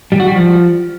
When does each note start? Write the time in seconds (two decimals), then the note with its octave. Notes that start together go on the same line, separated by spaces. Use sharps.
0.12 G3
0.20 F#4
0.28 G3
0.36 F3